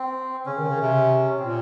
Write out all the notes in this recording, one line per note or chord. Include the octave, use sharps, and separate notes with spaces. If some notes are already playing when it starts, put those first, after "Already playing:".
Already playing: C4
C#3 C#4
D#3
C#3
C3
A#2 C4